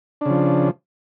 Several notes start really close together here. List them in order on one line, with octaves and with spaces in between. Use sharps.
D4 C#3 F3